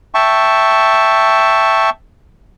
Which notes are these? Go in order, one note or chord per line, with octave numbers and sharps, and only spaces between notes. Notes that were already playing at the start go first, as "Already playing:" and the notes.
E5 G5 A5 C#6